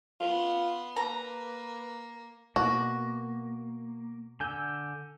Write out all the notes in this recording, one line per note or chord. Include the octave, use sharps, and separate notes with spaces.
B3 F4 C6
A#3 B4 A#5
B2 A#3 F#4
D3 G#5 E6 G6